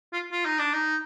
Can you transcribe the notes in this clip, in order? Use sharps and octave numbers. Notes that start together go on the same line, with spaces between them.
F4
F4
D#4
D4
D#4